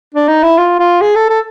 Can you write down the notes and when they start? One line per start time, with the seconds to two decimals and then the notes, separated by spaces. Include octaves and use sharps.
0.14 D4
0.28 D#4
0.43 E4
0.58 F4
0.79 F4
1.01 G#4
1.16 A4
1.30 A4